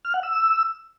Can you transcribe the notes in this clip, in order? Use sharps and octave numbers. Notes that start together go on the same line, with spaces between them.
F6
F#5
E6